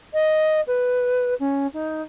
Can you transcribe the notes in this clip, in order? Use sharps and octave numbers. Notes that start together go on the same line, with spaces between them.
D#5
B4
C#4
D#4